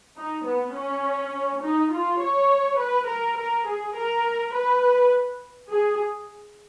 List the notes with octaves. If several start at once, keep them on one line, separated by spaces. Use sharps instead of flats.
D#4
B3
C#4
D#4
F4
C#5
B4
A#4
A#4
G#4
A#4
B4
G#4